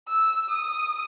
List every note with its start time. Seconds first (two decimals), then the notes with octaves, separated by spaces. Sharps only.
0.09 E6
0.50 D#6